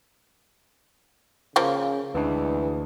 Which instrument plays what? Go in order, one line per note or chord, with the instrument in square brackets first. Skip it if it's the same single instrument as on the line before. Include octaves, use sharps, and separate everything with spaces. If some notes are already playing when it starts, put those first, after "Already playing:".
[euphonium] C#3 [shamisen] F3 A#3 F4
[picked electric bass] D2 D4 [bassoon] E3 [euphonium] G#3